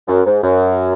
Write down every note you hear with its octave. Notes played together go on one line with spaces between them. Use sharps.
F#2
G#2
F#2